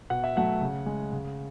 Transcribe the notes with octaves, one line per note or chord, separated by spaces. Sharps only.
B2 F#5
E5
F#3 A3 F#5
C#3
G#3
C#3